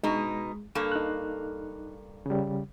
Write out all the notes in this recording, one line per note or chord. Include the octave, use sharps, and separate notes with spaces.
B2 G#3 D#4
G2 A#3 A4
D#4 F#6
C#3 G3